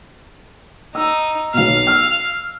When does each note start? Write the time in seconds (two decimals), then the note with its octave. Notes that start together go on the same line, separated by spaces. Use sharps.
0.95 D#4 E6
1.54 B1 B2 F5
1.87 E6 F6